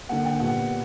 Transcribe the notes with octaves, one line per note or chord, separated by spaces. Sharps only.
D3 A#3 F#5
G5
A#2 G3 B3 F#5